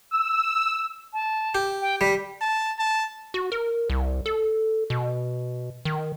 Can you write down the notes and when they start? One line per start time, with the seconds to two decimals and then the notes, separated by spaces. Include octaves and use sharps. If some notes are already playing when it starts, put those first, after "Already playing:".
0.11 E6
1.13 A5
1.55 G4
1.82 G5
2.01 G3 B6
2.41 A5
2.78 A5
3.34 F#4
3.52 A#4
3.90 C2
4.26 A4
4.90 B2
5.85 D#3